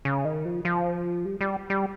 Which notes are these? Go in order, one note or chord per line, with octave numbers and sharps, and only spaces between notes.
C#3
D#3
F3
F3
G3
G3
G3